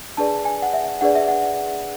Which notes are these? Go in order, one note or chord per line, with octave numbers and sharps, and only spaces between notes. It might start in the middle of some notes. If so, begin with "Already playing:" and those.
D4 G#4 B4 D5 A5
G#5
F#5
E5
D4 G#4 B4 D5 F#5
E5
F#5